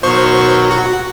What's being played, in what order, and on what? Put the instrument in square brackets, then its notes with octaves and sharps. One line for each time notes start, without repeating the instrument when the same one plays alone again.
[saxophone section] B2 [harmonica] D#3 F#3 [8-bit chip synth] C5 C#6
[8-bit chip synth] F#4